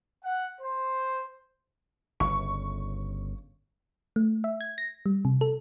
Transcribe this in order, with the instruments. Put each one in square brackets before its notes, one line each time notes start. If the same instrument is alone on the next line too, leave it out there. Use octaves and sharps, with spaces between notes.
[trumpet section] F#5
C5
[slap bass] G1 C#3 [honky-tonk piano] C#6
[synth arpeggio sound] A3
E5
G#6
A#6
G3
C3
A4